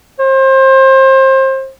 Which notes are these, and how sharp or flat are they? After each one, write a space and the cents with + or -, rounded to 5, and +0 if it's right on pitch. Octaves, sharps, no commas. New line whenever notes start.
C5 +30